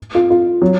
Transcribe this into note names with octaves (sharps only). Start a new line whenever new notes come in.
F4
F4
F#3